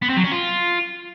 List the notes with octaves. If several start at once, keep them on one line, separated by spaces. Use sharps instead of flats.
B3
C4
F#3
C#4
F4